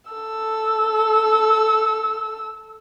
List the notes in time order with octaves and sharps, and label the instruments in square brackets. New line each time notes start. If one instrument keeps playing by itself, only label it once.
[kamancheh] A4 E6